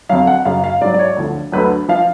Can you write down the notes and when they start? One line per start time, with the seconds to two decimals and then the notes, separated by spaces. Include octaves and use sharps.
0.09 F2 D3 F#3 F5
0.27 F#5
0.45 F#2 C#3 F#3 F5
0.64 F5
0.81 G#2 D5
0.85 F#3
0.94 D5
0.99 C#5
1.17 D2 D3 F3
1.52 D2 D3 F#3 B4
1.89 F3 F5